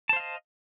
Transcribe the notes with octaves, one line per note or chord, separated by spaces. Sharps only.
C5 D#5 F5 A5